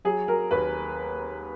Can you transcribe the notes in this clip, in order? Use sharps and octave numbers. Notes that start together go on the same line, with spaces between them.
F#3 G#4
F#3 A#4
D#2 B4